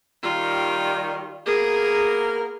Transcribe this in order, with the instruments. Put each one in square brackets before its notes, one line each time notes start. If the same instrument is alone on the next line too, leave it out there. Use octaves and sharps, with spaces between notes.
[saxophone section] D#3 G3 [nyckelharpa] F4
[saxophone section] A#3 B3 A#4 [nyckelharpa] G#4